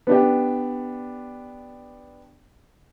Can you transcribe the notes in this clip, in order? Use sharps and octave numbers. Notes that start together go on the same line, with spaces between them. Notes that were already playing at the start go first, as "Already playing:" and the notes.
B3 D4 G4